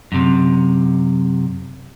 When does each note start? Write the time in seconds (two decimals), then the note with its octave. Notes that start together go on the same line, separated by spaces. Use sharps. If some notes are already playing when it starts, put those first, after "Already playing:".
0.12 F#2 C3